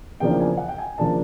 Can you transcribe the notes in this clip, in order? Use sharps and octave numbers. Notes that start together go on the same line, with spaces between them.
E2 C#3 F3 A#3 D4 G5
G#5
F#5
G5
G#5
C#3 F3 A#3 D4 A5